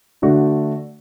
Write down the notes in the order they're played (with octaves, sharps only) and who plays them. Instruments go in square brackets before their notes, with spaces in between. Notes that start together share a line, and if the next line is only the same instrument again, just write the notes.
[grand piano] D3 A3 D4 F#4